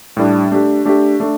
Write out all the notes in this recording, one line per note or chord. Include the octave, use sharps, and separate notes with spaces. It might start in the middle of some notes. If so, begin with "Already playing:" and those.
A2 G3 D4
A3 D4 G4
A3 D4 G4
A3 D4